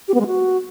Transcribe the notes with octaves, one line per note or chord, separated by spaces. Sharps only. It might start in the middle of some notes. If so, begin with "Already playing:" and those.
G4
B3
G#3
F#4